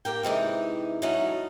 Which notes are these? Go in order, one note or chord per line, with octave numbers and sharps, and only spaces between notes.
A#3 G4 A#4 G5
C3 E3 G#3 D#4
F#3 A3 B3 C#4 D#4